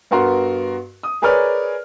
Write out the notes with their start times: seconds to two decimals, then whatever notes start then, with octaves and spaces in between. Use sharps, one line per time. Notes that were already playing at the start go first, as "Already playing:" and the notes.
0.11 G2 B3 F#4 A#4 C6
1.03 D#6
1.22 G#4 A#4 B4 C#5 D5 F6